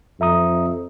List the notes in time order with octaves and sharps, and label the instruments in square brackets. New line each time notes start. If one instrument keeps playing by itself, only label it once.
[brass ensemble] F2 [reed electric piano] E5 A#5 D#6